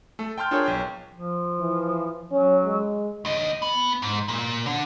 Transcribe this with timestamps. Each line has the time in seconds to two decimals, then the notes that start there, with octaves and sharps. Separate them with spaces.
0.19 A3 A4
0.38 G5 A5 C6 F6 G6
0.51 D4 F4 G#4 A#4 C#5
0.65 B1 G5
1.13 F3
1.60 E3
2.31 F#3 C#4
2.64 G#3
3.25 D#2 D#5
3.62 B3
4.02 G#2
4.28 A#2
4.66 D3